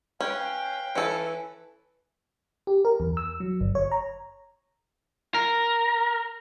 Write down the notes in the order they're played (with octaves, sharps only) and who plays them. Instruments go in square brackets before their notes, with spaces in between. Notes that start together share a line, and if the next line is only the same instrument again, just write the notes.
[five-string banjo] C#4 [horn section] B4 F5 G5
[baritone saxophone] E3 [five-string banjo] C#4 A4
[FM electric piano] G4
A#4
E2
E6
F#3
G1
C#5
A#5
[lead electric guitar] A#4